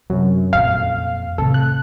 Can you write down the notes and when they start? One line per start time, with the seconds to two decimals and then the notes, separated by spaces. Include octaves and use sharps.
0.10 F#2 C3
0.53 F2 A#2 F5
1.38 A2 C3 A4
1.54 F#6